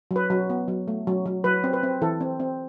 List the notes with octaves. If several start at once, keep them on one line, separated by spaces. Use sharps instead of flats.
F#3
B4
F#3
B3
F#3
A3
F#3
F#3
F#3 B4
C4
B4
C4
E3 A4
C4
C4